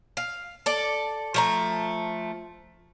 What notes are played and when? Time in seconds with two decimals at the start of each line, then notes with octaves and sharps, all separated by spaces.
0.17 F5
0.66 A4 D5
1.34 F3 A3 A#5